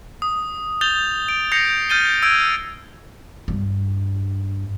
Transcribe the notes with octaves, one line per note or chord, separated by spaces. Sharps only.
D#6
D#6 G6 A6 F7 G7
D7
G6 A#6 C7 C#7 F7
F6 G6 A6 D#7 G7
E6 G6 G#6 D7
G2